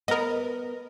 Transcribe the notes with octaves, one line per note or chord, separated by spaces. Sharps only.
B3 A#4 D#5